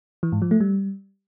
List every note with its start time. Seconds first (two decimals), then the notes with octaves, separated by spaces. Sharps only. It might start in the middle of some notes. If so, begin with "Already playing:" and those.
0.23 E3
0.32 G#2
0.42 F3
0.51 A3
0.60 G3